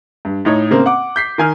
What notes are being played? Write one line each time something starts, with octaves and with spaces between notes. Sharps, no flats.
G2
A2 D#4 C#5
C#3 A#3 C4
F#5 D6
G6 B6 C7
D#3 G#5 F6